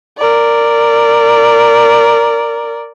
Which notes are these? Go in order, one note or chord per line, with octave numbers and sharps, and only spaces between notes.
A#4 D5